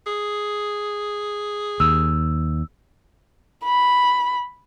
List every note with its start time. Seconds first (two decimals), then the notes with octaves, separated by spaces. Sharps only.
0.06 G#4
1.80 D#2 E6
3.64 B5